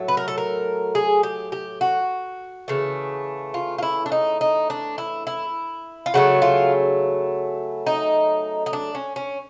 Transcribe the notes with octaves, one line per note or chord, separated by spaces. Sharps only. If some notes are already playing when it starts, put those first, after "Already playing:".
Already playing: A2 F#3 A3
B4
A#4
A4
A#4
G#4
G4
G4
F#4
C#3 E3 A3
F4
F4
E4
D4
D#4
D#4
D4
E4
E4
F4
C#3 F#3 A3 F#4
F4
D#4
D#4
D4
C#4
C#4